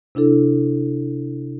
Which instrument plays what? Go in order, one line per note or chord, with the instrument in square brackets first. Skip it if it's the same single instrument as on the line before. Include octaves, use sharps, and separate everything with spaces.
[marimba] C3 D4 E4 A4